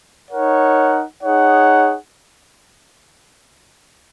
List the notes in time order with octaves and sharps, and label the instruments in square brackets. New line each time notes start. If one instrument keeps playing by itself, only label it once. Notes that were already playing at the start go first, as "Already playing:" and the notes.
[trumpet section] D#4 A#4 C#5 F#5
D#4 G#4 C#5 F#5